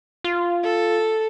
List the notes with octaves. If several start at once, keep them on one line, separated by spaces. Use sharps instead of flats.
F4
A4